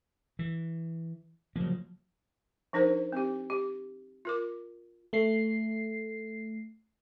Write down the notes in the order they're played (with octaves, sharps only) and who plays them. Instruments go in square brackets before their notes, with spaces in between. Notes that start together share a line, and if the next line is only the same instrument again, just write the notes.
[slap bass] E3
[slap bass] C#3 A#3 [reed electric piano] F3 F#3
[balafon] F3 D4 D#4 A#4 C5
C4 G4
G4
F4 A#4 D6
[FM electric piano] A3 C7